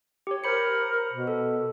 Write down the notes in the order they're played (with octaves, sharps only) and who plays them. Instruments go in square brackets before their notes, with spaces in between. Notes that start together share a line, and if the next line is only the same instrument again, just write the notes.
[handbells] G4 C#5
[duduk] A#4 [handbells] C5 B5 C#7
[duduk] B2
[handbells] A4